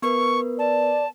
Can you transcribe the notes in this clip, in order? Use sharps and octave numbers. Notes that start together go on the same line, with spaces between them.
B3 A#4 B4 C#6
D5 A5